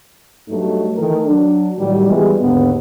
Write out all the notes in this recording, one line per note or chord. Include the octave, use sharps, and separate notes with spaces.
G2 F#3 A3 D#4
D#3 E3 A3 A4 A#4
F#3 D4
A2 D#3 F#3 G3
B2 E3 G3 G#3
D#2 G#2 D3 B3